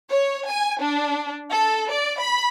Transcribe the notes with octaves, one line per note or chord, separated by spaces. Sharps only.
C#5
G#5
D4
A4
D5
B5